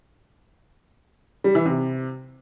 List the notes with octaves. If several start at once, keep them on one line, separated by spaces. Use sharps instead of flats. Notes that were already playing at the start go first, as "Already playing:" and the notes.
G3
E3
C3